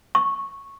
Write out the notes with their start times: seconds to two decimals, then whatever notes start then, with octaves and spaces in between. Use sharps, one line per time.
0.15 C#6